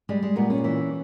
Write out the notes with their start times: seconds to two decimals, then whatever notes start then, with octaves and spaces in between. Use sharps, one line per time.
0.09 G3 G#3
0.23 G#3
0.36 A#2 B3
0.50 C#4
0.64 E3